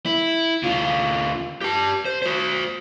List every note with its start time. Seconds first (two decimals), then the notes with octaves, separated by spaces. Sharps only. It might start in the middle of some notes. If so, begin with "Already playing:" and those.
0.06 E4
0.63 D2 F4
1.61 G4 A5
2.05 C5
2.22 F#4 C5